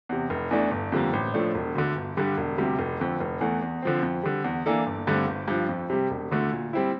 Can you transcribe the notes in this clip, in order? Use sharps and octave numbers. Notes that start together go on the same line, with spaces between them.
E2 C3
F1
E2 E3 A3 D4
G1
F2 D3 G3 A#3
A1
A2 F3 A3 D4
E1
D2 D3
G1
G2 D3 G3
E1
D2 C3 G3
F1
F2 D3
F1
E2 E3 A3
E2
D3 F3 C4
F2
D3 G3
E2
E3 A#3 D4 A4
G1
G2 D3 A3 C4
G1
G2 F3
F2
C3 G3
E1
D2 D3 A3
A#2
G3 C4 E4